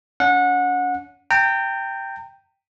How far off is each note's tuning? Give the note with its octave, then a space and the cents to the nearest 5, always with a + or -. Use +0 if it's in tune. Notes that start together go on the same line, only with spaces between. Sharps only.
C#4 +35 F#5 -25
G5 +0 A#5 -40